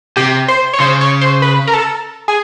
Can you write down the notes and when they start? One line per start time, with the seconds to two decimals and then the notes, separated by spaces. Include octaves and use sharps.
0.17 C3 G4
0.48 C5
0.73 C#5
0.80 C#3 C5
1.01 C#5
1.21 C5
1.42 B4
1.67 A#4
1.73 A4
2.28 G#4